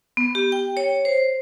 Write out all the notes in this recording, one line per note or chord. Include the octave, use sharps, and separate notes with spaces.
B3
G4
G5
C#5
C5